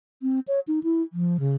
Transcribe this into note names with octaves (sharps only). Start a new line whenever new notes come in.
C4
C#5
D#4
E4
F3
C#3